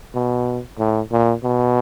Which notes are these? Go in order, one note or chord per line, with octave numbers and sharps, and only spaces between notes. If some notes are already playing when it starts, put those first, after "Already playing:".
B2
A2
A#2
B2